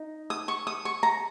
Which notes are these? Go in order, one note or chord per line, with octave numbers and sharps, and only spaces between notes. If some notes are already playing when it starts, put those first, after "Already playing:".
Already playing: D#4 D#5
D#6
C#6
D#6
C#6
A#5